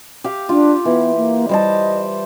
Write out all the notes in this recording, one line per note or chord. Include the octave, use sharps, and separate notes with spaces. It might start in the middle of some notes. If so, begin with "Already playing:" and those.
G4 F5
D4 F4
E3 B3
A#3
G3 C5 D#5 A5